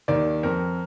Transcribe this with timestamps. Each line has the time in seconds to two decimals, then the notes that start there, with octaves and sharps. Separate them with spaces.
0.08 D#2 D#3 D5
0.43 F2 A#4